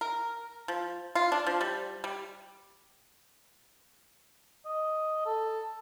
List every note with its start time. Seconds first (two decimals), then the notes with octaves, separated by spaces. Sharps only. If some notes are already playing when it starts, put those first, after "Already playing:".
0.01 A#4
0.68 F3
1.15 F4
1.32 D4
1.47 F3
1.61 G3
2.04 G3
4.65 D#5
5.26 A4